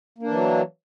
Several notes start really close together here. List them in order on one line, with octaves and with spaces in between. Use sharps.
A#3 D4 E3 F#3